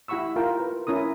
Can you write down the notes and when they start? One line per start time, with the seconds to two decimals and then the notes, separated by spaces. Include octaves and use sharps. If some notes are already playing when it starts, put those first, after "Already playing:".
0.08 E4 G4 F#5 B5 C#6 E6
0.36 F4 A#4 G5
0.60 B4
0.87 C#4 E4 A#4 D#6